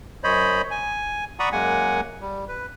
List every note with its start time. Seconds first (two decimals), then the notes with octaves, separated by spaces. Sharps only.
0.24 F#2 C5 C#5 D#5 B5
0.71 G#5
1.39 D5 F#5 A#5 B5 C#6 D#6
1.52 F#2 G#3 A#3 F#5 G#5
2.21 G3
2.48 B4